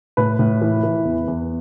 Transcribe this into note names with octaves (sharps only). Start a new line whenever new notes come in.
A2 B4
A2
E3
E3
E2
E2